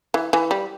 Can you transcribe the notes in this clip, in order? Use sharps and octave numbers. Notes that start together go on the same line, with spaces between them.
E3
E3
G3